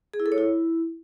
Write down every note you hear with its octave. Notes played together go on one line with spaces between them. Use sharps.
G#4
E4
A4
C#5
E4